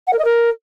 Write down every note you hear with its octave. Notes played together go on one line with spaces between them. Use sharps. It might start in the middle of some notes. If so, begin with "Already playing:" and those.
F#5
A#4
D#5
A#4